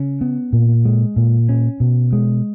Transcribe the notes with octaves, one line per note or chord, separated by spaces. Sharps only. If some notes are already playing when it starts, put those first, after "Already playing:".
Already playing: C#3 C#4
B3
A#2
G#3
A#2
C#4
B2
G#3